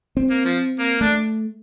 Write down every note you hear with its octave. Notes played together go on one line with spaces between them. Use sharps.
C4
A#3
F3
A#3
A3 D4